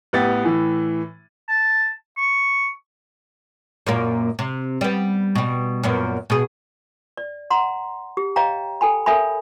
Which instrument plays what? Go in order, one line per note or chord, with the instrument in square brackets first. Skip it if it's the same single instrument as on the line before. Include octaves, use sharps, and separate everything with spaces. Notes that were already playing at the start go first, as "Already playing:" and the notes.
[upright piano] A1 B3 G4 A6
A2 E3
[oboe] A5
C#6
[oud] F#2 A#2 A#3
C3
G3 B3
B2 G3
F#2 A#2 B3
B2 G#4
[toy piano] D5
F#5 A#5 C6
G4
C#5 D#5 F5 G5 A#5
A4 G5 G#5 B5
A4 A#4 C#5 E5 G#5 B5